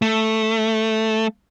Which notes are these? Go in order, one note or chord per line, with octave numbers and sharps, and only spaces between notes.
A3